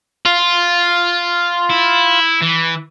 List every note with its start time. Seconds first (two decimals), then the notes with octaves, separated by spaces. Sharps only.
0.25 F4
1.70 E4
2.42 E3